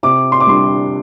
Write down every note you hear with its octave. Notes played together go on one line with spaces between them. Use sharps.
C3 D6
C6
D6
G3 D4 C6